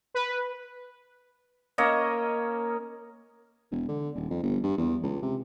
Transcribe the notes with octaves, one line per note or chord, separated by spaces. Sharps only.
B4
A#3 C#4 C#5 D#5
E1
D3
D#1
F2
G1
G2
E2
C#2
C3